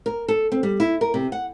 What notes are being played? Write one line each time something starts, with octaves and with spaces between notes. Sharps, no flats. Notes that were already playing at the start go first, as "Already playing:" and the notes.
A#4
A4
C4
G3
E4
A#4
C3
F#5